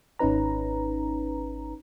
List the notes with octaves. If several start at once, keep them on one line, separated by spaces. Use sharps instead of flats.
G#1 C#4 D#4 B4 A#5